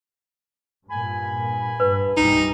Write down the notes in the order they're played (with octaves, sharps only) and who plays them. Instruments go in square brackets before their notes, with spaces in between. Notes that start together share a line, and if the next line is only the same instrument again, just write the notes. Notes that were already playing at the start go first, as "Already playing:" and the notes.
[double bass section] G2 A#2 [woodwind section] G#5 B5
[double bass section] G2 [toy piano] B4
[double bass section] C2 A#2 G3 [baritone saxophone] D#4